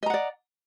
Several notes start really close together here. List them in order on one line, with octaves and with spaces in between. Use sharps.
D#5 A#5 F#5 D5